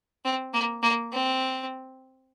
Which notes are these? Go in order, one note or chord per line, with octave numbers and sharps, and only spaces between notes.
C4
A#3
A#3
C4